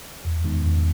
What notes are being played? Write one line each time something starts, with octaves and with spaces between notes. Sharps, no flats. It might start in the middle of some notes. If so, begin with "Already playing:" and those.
E2
D#3 G#3 B3 D#4
E2